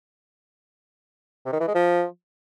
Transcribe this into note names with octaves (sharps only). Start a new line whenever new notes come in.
C3
D#3
E3
G#3
F3